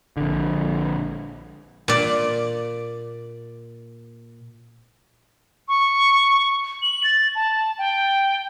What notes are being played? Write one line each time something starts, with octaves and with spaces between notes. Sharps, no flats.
A#1 D3
A#2 D5
C#6
F#7
A6
A5
G5